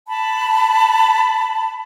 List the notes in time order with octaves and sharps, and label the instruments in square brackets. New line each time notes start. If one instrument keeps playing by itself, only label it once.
[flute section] A5 B5